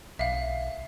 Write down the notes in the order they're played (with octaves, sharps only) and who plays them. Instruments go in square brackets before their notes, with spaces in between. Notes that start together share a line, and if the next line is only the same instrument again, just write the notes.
[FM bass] B1 [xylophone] E5 F5